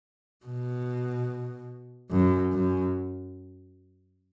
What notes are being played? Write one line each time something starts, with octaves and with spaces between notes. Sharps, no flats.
B2
F#2
F#2